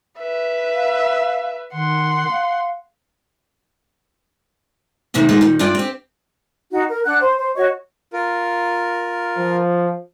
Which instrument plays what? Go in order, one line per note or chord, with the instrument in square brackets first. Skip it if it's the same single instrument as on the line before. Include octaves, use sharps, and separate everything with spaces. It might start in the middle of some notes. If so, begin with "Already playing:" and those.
[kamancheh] B4 E5
[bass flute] F5
[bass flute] D#3 [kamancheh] F#5 C6
[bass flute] F5
[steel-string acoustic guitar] E2 A2 C3 D#3 E3
A#2 D#3 G#3 F4 F#4
A#2 D#3
G2 D4 E4 F4 D5 G5
C4 G4
[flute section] D#4 F#4
A#4
D4 F#5 F#6
C5
C5
F#4 C#5 D#5 C#6
[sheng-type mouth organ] F4 A#4
[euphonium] F3